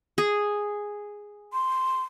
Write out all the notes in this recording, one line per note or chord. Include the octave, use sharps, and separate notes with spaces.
G#4
C6